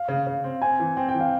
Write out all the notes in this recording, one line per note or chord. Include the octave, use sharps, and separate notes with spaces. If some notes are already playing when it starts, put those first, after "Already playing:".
Already playing: F5
C#3
C#3
C4
C4 G#5
E3
C4 G5
G5
E3
F5